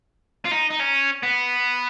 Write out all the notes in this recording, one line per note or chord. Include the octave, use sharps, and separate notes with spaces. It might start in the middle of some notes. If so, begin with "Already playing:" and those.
F4
D#4
D#4
C#4
B3